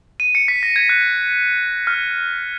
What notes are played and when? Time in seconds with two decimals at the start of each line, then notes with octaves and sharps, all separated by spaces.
0.20 D#7
0.35 C#7
0.48 B6
0.63 A#6
0.76 G#6
0.89 F#6
1.87 F6